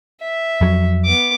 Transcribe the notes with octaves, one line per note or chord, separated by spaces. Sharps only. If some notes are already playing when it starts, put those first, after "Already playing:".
E5
F2 F#3
B3 D6